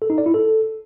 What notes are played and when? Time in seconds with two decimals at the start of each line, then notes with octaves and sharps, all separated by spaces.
0.02 A4
0.10 D#4
0.18 D5
0.26 E4
0.34 A4